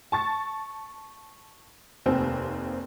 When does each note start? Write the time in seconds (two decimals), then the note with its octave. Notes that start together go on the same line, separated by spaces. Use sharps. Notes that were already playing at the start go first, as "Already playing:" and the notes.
0.12 A5 C#6 A6
2.06 F1 D#2 C4